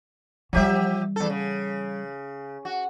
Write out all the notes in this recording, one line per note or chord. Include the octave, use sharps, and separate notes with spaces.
E3 F3 G3 G4 E5
E2 A4
C#3
F#4